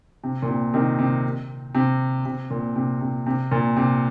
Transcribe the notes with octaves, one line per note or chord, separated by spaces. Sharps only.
C3
A#2
C3
C3 D#3
C3
C3
C3
A#2
C3
C3
C3
A#2
C3